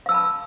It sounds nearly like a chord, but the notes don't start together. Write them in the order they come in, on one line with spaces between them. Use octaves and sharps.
F5 E6 A5 B5